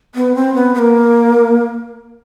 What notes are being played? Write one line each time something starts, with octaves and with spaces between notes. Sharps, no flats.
B3
C4
B3
B3
A#3